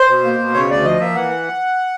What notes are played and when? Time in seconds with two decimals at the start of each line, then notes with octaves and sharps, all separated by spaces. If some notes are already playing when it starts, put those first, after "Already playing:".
Already playing: C5
0.09 B2
0.24 A#3
0.39 B2
0.54 C#3 C#5
0.69 D2 D5
0.85 F3 D#5
1.00 A#3 E5
1.16 E3 F#5